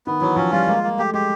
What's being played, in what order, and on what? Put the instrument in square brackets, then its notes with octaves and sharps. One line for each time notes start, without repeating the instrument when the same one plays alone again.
[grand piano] D#3 [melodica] B3
[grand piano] E3 [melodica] F#3
[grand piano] F3 [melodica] C#4
[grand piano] G3 [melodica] F4
[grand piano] G#3 [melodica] A#3
[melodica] A#3
[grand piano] A3 [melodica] G4
[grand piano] G#3 [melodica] G4